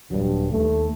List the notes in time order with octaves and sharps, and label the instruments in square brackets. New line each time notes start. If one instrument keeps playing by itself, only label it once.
[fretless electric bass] D#1 F#3 [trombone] G2
[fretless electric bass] D#2 [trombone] A3